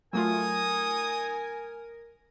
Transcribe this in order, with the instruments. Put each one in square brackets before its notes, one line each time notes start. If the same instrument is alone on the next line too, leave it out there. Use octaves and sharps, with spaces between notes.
[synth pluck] F#3 A3 F4 [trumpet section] D#4 D#6 [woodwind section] A#4 [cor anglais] G#5